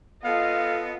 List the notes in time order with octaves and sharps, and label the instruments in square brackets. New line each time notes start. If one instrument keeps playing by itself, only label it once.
[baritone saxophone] B3 [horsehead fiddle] F4 D#5 [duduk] A4 [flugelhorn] F5